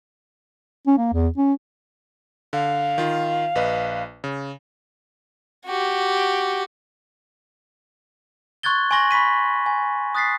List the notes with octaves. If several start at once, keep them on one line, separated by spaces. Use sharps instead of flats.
C#4
A#3
E2
C#4
D3 F5
D#3 F4
A#1 B4 D#5
C#3
F#4 G4
C6 C#6 F#6 G#6 A6 G7
G#5 C6 C#6 A#6 F#7
B5 C#6 B6 D#7
G#5
D#6 F#6 A6 B6 C7